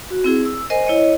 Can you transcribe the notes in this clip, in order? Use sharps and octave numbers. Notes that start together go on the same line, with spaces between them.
F#4
C4 E4 G#4
E6
A#4 C5 D#5 G#5
E4 C#5 D#5